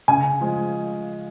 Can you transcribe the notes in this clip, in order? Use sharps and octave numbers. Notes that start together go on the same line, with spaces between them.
C#3 G#5
F3 G#3